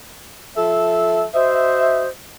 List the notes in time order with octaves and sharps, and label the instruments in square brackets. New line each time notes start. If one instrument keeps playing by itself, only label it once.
[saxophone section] F3 A4 E5
[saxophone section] F#4 D#5 E5 [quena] C5